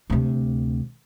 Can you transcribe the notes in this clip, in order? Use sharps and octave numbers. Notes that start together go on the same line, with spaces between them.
D2 C3